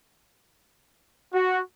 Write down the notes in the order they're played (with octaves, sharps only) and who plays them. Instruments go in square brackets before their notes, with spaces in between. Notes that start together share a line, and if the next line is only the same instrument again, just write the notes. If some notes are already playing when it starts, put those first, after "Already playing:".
[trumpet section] F#4